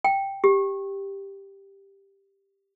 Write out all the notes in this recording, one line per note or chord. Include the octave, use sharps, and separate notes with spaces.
G5
G4